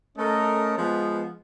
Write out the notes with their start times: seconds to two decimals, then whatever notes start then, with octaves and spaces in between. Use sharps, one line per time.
0.18 A3 C#4 A4 A#4 D#5
0.77 F3 G#3 B3